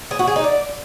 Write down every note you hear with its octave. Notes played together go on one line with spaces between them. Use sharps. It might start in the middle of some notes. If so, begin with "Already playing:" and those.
G#4
F#4
G#4
D#4
D5